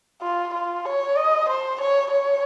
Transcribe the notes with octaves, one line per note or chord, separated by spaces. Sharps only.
F4
F4
C#5
D#5
C5
C#5
C#5